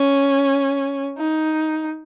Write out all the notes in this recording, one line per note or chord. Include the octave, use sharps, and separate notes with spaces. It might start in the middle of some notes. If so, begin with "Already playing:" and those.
Already playing: C#4
D#4